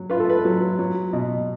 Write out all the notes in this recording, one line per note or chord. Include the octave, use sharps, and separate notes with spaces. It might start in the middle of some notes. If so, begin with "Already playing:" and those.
Already playing: F#3
F4 B4
A4
B4
F#3
F#3
B2